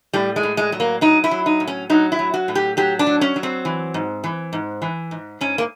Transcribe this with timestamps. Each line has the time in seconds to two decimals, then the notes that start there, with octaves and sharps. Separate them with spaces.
0.13 A2 G3
0.36 G#3
0.43 A2
0.57 G#3
0.72 F#3
0.80 A#3
1.01 F#3 D#4
1.24 E4
1.31 F#3
1.46 D#4
1.60 A2
1.67 C#4
1.90 F#3 D#4
2.12 E4
2.19 F#3
2.34 F#4
2.48 A2
2.55 G4
2.77 F#3 G4
2.99 D4
3.07 F#3
3.21 C#4
3.36 F#3
3.43 C4
3.65 E3
3.94 G#2
4.24 E3
4.53 G#2
4.82 E3
5.11 G#2
5.41 G#2 C#4
5.58 A#3